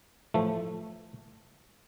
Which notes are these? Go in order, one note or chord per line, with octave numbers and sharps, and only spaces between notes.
A2 E3 F3 A3